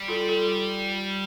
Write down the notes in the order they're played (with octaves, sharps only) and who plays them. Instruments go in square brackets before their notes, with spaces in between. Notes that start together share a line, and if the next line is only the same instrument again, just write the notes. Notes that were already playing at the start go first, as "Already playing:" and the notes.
Already playing: [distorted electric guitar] G3
[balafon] F4 A4
F4 A4